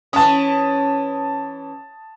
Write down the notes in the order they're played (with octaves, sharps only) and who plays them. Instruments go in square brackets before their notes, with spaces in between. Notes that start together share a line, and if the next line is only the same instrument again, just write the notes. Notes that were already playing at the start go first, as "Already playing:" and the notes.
[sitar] E3 C#4 [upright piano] A5 D#6